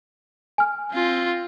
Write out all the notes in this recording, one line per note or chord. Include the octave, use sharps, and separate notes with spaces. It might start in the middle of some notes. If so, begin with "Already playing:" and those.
G#5 F6
C4 F4